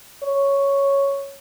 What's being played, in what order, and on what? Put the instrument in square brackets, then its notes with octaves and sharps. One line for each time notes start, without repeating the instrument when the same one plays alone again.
[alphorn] C#5